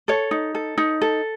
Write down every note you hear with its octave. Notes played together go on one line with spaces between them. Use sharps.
A4 C#5
D#4
A4
D#4
A4